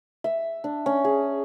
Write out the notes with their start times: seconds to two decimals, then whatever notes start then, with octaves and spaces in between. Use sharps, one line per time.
0.24 E5
0.64 D4
0.86 C#4
1.04 G#4